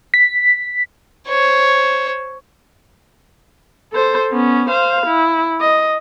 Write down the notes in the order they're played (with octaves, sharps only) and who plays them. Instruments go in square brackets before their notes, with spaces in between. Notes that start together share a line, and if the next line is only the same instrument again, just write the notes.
[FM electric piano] B6
[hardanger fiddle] C5 C#5
[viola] A4 C5
B3 C#4
C5 F5
E4
D#5